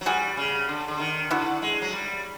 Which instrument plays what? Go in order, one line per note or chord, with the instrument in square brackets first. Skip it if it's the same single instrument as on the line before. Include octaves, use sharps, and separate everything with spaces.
[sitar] F#3
[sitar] G3 [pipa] F#4 G#4
[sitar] C#3
D3
D3
D#3
[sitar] D3 [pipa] E4 F#4
[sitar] G#3
F#3
G3